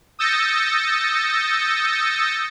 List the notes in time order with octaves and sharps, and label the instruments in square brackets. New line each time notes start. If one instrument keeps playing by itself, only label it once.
[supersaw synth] D#6 E6 G6 A6 A#6 C#7